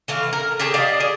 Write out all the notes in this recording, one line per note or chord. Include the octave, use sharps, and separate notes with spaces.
E3 A3 F5
A#4
G4 G#4 C#5 A5
G4 D5 D#5 F5
G#4